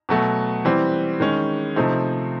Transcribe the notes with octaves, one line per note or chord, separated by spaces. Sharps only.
B2 F#3 A3
E3 G3 C4
D#3 G#3 C#4
C3 F3 A3 C4 D#4